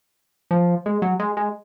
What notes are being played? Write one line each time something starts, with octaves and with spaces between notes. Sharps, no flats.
F3
G#3
F#3
G#3
G#3